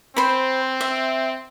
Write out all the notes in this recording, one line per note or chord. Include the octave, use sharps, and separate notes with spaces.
C4 C5 B5
E5